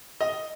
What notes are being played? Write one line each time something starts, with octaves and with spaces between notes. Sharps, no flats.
D#5